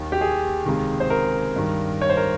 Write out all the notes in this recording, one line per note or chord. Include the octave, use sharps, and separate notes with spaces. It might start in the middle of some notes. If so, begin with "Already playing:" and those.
Already playing: D#2 D#3
G4
G#4
C#2 C3 D#3
C5
A#4
G2 D#3
C#5
C5
A#4